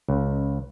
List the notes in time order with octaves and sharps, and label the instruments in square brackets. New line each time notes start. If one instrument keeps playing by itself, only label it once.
[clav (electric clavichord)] C#2